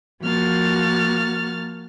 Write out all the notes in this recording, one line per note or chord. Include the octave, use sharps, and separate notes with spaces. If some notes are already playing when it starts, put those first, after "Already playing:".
F3 A#3 F#4 F6 A6